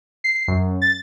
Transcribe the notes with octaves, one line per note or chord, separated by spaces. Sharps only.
C7
F#2
A6